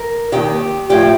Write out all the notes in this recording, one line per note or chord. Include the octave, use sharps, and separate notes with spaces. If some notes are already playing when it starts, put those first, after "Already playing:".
Already playing: A#4
D#2 D#3 G4
A2 F3 G4